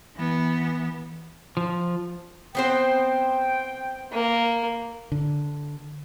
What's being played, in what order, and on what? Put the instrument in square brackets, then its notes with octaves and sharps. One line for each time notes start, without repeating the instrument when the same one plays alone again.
[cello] E3 B3
[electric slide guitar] F3
[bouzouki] B3 C4 C5 [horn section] G5
[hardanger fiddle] A#3
[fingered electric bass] D3